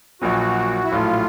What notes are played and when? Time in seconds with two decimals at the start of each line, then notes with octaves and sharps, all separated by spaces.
0.22 A#1 A#2 F#3 F#4
0.84 E4
0.91 A#1 A2 F#3 A3 F4